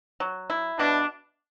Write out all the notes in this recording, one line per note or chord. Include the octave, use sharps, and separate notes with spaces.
F#3
E4
B2 D4